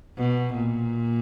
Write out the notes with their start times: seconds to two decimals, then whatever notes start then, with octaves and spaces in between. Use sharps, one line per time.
0.17 B2
0.53 A#2